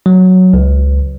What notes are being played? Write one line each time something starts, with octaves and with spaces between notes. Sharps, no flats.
F#3
C#2